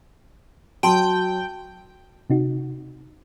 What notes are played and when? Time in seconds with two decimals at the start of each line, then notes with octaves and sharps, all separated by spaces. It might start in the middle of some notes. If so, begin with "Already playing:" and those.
0.83 F#3 G5 A5 C6
2.30 C3 D#4 F#4